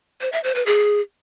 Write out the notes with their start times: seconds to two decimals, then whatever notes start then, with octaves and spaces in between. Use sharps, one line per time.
0.21 C5
0.32 E5
0.44 C5
0.55 B4
0.66 G#4